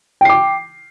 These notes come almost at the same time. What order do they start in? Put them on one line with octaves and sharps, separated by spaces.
G5 C7 D6